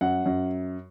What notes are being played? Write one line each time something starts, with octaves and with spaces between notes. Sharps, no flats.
F#2 F#5
F#2